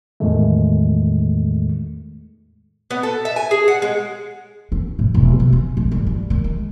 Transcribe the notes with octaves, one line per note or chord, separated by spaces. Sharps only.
E2 A2 D#3 G#3 A3
B3
A4
E5
G#5
G#4
F#5
G#3
C#4
A2
E1
B2
C#4
A#1
G2
G3
D#3
G#3